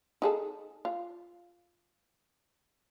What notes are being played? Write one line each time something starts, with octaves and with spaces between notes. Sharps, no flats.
D#4 G#4 A4
F4